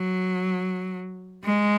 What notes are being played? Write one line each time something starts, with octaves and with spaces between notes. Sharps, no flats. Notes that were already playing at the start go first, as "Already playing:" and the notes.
Already playing: F#3
G#3